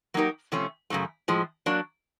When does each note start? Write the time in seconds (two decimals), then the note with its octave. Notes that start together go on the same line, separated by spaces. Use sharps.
0.14 F#3 A#3 D#4 G4 A#4
0.52 C3 F3 A3 C#4
0.90 F#2 C#3 F#3 A3
1.28 A2 F3 G#3
1.66 F#3 A#3 D4